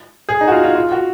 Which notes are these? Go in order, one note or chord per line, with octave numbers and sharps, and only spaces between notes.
G#4
D#4
F#4
F4
F4
F4
F#4